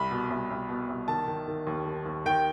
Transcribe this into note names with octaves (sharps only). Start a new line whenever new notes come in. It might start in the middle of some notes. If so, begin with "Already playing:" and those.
Already playing: C2 B5
B2
C2
C2
B2
C2
D#3 A5
D#3
D#3
D#2
D#3
D#2
D#3 G5